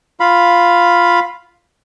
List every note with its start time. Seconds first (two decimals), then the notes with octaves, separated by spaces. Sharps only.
0.20 F4 F5 B5